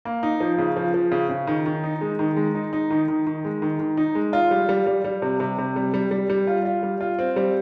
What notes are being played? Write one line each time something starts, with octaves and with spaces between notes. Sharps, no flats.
A#3
D#4
F3
C#3
F3
F3
C#3
C#3
D#3
D#3
D#4
G#3
D#3
G#3
D#4
D#4
D#3
D#3
D#3
G#3
D#3
D#3
D#4
G#3
F4
G3
G3
G3
G3
C3
C3
C3
G3
G3
G3
G3
F4
F4
G3
F4
C4
G3